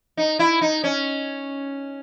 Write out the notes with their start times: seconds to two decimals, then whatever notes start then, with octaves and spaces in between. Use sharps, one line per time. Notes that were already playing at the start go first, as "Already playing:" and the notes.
0.17 D#4
0.39 E4
0.61 D#4
0.84 C#4